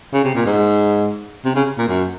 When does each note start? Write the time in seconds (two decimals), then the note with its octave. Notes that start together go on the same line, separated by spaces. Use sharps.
0.13 C#3
0.24 C3
0.35 A#2
0.46 G#2
1.45 C3
1.55 C#3
1.78 A#2
1.89 F#2